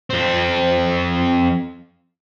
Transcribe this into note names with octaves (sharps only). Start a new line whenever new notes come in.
F2 C4